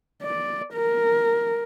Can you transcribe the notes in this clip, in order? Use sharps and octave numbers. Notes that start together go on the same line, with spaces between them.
D5
A#4